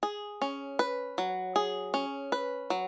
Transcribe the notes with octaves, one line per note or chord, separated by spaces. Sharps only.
G#4
C#4
B4
F#3
G#4
C#4
B4
F#3